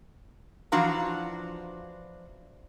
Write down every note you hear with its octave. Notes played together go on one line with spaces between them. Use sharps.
E3 F3 D4 F#4 F5 A#5